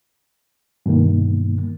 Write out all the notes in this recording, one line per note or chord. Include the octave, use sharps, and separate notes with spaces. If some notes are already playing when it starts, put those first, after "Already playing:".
G2 B2 D#3 A#3